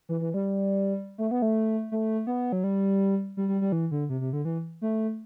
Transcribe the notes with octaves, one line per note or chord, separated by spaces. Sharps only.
E3
E3
G3
A3
B3
A3
A3
B3
F#3
G3
G3
G3
G3
E3
D3
C3
C3
D3
E3
A3